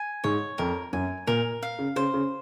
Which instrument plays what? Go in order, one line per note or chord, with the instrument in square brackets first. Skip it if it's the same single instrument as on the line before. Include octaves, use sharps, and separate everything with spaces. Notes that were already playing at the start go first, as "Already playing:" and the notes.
Already playing: [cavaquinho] G#5
[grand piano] G#2 [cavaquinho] C#5
[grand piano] F2 [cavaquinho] A#4
[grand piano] F#2 [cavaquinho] G#5
[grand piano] A#2 [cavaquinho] A#4
[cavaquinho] F5
[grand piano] C#3
[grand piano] C#3 [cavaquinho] C5
[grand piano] C#3